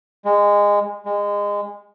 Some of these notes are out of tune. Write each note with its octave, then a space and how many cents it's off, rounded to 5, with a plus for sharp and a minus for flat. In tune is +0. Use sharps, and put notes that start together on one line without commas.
G#3 -20
G#3 -25